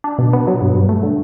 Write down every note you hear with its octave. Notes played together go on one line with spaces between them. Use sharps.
D4
B2
B3
F#3
G2
G2
A3
D3